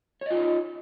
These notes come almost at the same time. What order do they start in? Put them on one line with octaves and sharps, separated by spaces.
C#5 D#5 F4 D#4